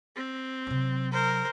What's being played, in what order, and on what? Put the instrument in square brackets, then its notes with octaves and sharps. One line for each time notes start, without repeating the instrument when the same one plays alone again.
[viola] C4
[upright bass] C3 F#3
[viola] A#4 C5